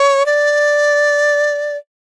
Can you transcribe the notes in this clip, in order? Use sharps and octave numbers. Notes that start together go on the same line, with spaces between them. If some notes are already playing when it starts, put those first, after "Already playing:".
Already playing: C#5
D5